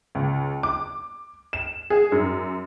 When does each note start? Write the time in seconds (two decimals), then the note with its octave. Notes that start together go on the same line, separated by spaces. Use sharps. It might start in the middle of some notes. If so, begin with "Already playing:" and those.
0.15 C#2
0.63 D6
1.53 E7
1.90 G#4
2.12 F#2